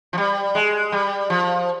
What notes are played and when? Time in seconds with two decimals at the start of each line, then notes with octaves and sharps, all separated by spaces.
0.13 F3
0.18 G3
0.55 G#3
0.92 G3
1.30 F3